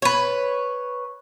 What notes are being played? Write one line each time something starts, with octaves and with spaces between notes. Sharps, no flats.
B4 C#5